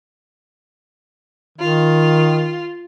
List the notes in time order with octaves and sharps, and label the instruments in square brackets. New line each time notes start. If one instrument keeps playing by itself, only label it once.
[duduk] D#3 [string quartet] F4